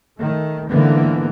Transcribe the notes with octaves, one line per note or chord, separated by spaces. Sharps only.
D#3 A3
G#2 D3 E3 A#3 B3